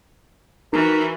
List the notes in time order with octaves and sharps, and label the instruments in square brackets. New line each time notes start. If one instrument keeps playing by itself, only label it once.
[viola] E3 F#4 [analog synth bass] D#4 [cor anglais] A#4